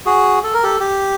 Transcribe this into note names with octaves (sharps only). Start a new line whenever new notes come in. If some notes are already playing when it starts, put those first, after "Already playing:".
F#4 G#4
A4
A#4
G4 A4
G4